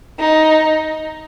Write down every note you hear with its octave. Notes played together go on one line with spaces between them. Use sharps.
D#4